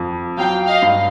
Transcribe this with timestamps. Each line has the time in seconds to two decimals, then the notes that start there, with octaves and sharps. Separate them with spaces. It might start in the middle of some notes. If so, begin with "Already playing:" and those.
Already playing: F2
0.38 F#3 F5 G5
0.67 D#5 F5
0.82 G2